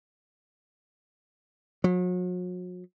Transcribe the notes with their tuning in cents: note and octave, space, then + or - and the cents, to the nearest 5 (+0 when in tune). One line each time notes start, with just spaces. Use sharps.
F#3 -40